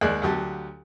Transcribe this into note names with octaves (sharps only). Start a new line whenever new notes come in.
D#2 G#3 D5 G#5 F#6
D2 F#3 G4 A5